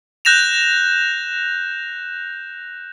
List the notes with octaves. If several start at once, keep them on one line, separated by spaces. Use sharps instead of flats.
F#6 G6 A#6 E7 F7